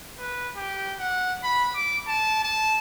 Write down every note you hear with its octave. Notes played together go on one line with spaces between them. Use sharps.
B4
G4
F#5
B5
D6
A5
A5